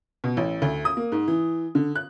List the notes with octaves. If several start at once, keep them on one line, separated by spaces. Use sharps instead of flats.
B2
A1
D2
D#6
A#3
G#2
E3
D3
F#6